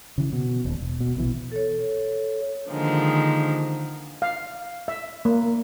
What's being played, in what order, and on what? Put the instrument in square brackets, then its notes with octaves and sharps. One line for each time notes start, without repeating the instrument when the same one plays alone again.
[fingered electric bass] C#3 E3
B2
D#1
E1
B2
A#1 B2 E3
[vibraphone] A4 C#5
[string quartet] D3 D#3 F3 G#3 A#3
[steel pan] F5
E5
A#3